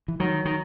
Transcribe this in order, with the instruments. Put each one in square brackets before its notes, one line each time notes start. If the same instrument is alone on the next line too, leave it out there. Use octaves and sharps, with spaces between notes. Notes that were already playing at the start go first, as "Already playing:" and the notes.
[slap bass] E3
[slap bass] D#3 [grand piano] F#3
[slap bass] D#3